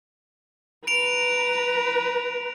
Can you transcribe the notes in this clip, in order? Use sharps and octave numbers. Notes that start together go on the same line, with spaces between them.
B4 A#5 D7 F7